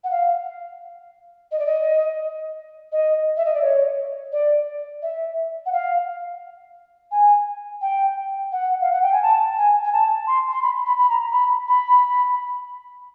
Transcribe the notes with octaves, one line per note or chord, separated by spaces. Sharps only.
F#5
F5
D#5
D5
D#5
D#5
E5
D#5
D5
C#5
D5
E5
F#5
F5
G#5
G5
F#5
F5
F#5
G5
G#5
A5
G#5
G#5
A5
C6
C6
B5
B5
B5
A#5
B5
B5